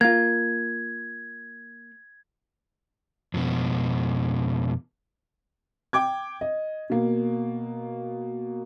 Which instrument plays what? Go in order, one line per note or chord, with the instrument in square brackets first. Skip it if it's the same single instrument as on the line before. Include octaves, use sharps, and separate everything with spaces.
[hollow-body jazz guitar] A#3 F4 [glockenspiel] G#6
[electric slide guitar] F2 B2
[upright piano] G5 D6 G#6
D#5
B2 A#3